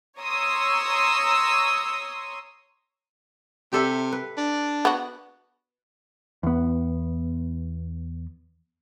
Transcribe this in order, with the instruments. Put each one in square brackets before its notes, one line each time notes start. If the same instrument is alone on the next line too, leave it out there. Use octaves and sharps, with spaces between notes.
[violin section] C#5 A#5 C6 C#6 D#6 E6
[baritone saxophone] C3 [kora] G4 A4 E5
[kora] B4
[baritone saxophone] D4
[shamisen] B3 F#4
[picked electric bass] E2 B3